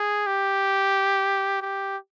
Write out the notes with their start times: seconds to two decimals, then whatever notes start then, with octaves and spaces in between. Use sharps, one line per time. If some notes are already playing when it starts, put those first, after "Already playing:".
Already playing: G#4
0.26 G4
1.61 G4